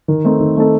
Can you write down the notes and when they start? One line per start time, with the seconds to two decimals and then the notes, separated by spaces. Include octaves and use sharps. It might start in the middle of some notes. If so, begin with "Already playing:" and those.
0.08 D#3
0.25 A3 C4 D#4 A4
0.40 D#3
0.56 A3 C4 D#4 A4